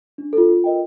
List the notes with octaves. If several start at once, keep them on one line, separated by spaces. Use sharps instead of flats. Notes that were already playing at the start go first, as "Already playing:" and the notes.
D4
F4 A4
F4
A#4 D#5 G5